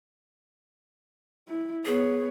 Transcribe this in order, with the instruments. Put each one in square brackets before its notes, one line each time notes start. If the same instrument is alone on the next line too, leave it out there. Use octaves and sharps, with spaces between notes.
[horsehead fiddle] E4
[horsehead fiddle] B3 C#5 [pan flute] G#4